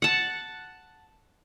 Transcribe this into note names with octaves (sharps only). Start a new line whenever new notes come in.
F#5 A5